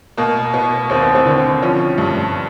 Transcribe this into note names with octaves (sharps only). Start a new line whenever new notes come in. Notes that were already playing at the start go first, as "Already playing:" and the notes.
B2 A#3
B2 B3
D#2 C4
B3
C4
D3
F3 C#4
G2